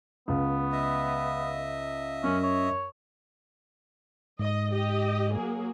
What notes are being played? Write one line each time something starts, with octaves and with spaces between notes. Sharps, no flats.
C#2 B3
D#5 E5
F#2 C#4
C#5
G#2 D#5
G4 D#5
F#3 A#3 G#4